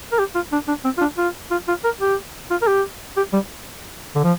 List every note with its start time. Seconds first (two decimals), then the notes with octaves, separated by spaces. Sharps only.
0.12 A#4
0.19 G4
0.35 F4
0.52 D4
0.68 D4
0.84 C4
0.98 F4
1.01 D4
1.18 F4
1.51 F4
1.68 F4
1.84 A#4
2.00 G4
2.51 F4
2.62 A#4
2.67 G4
3.17 G4
3.33 G3
4.16 D3
4.24 F3